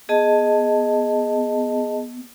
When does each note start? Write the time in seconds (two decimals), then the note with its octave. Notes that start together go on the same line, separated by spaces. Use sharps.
0.09 B3 G#4 D#5 A5